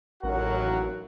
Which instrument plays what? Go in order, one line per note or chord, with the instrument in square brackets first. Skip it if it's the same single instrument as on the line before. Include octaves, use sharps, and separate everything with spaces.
[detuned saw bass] A1 [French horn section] D#2 A2 F#3 [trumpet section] F#4 A#4 F#5